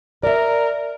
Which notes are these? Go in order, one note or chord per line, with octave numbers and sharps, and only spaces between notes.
A#4 D5 E5